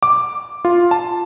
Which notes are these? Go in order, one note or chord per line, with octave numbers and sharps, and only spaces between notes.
D6
F4
A5